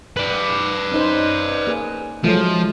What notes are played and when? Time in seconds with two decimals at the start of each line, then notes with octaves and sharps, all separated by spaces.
0.17 B4 D5
0.92 C#4 D#4 C5
1.67 A#3 G#4
2.24 F3 F#3 G#3 A3